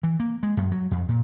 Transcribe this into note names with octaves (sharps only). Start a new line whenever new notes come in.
E3
A#3
G#3
F#2
F#3
F2
A#2